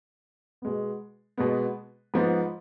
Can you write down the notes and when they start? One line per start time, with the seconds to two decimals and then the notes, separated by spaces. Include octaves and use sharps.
0.62 B2 G#3 B3
1.38 B2 G#3 B3
2.14 G#2 F3 B3